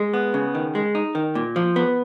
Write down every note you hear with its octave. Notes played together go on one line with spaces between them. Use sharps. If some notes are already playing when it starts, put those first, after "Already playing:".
Already playing: G#3
B3
C#3
D#3
G#3
D#4
D#3
A#2
F3
B3